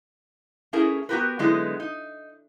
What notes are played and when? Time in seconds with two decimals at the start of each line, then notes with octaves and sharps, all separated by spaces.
0.73 A3 C#4 E4 G#4 A#4
1.09 B3 F#4 G4 A#4 B4
1.39 D3 F#3 G#3 B3 D#4 E4
1.80 D#4